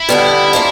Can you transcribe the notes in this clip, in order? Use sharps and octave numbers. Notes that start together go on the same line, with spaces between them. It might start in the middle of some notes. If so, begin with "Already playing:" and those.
Already playing: E4
F2 D3 G3 B3
F3 A#3 D4